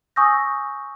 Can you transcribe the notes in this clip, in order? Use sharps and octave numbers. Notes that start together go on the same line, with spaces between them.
G#5 C#6 D#6 E6 G6 A#6